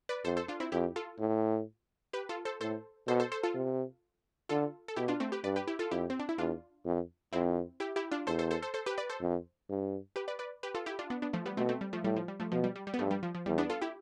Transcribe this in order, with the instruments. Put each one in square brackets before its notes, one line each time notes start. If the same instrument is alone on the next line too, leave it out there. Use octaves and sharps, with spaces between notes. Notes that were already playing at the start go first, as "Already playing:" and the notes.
[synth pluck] B4 D5
[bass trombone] F2 [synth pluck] A4 C5
[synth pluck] A4 C5
D4 F4
C4 E4
[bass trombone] F2 [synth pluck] E4 G4
[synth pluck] F4 A4
[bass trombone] A2
[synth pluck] G4 B4
F4 A4
A4 C5
[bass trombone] A2 [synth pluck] A4 C5
[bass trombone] B2 [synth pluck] A4 C5
[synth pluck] A4 C5
A4 C5
F4 A4
[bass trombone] C3
[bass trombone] D3 [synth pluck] F4 A4
[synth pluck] A4
[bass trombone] B2 [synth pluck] E4 G4
[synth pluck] D4 F4
A3 C4
G4 B4
[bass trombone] G2 [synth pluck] B4 D5
[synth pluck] G4 B4
E4 G4
F4 A4
[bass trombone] F2 [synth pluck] E4 G4
[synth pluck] C4
D4
E4
[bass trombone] E2 [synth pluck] D4 F4
[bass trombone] F2
[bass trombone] F2 [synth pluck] C4 E4
[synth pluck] E4 G4
E4 G4
D4 F4
[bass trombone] E2 [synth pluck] A4 C5
[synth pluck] A4 C5
A4 C5
A4 C5
A4 C5
G4 B4
B4 D5
A4 C5
[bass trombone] F2
G2
[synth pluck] G4 B4
B4 D5
B4 D5
G4 B4
F4 A4
E4 G4
D4 F4
B3 D4
B3 D4
F3 A3
G3 B3
[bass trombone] B2 [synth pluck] A3 C4
[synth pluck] A3 C4
G3
F3 A3
[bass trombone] A2 [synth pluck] G3
[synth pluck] F3
G3
F3 A3
[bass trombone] B2 [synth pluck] F3
[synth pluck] G3
G3
G3
B3
[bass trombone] G2 [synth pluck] F3 A3
[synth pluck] G3
F3
F3
[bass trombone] E2 [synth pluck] G3
[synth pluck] B3 D4
F4 A4
E4 G4